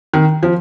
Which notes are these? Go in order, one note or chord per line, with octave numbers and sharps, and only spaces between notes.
D#3
F3